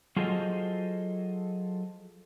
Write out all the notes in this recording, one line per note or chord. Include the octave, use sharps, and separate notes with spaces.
F#3 F4 G#4 A4 C5 D#5